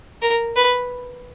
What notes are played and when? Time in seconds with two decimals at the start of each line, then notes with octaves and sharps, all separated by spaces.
0.22 A#4
0.56 B4